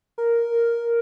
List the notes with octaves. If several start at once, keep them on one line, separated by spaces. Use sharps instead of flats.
A#4